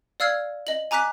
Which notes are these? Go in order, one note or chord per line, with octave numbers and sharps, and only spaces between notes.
D5 F5 E6 F6 G#6 C7
D#5 F#7
G#5 A#5 D6 F#6 B6